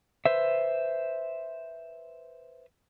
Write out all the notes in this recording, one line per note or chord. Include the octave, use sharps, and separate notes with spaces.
B4 C5 E5